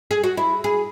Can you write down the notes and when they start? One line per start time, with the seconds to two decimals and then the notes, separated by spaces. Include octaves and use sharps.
0.11 G#4
0.24 F#4
0.37 E4
0.64 G#4